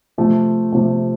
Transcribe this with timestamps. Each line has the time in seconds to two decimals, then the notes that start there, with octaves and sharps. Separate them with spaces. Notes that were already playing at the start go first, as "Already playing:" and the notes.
0.18 C3 F3 A3
0.72 C3 F3 A3